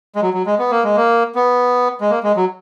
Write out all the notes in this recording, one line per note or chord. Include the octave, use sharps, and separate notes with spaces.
G#3
F#3
F#3
G#3
B3
A#3
G#3
A#3
B3
G#3
A#3
G#3
F#3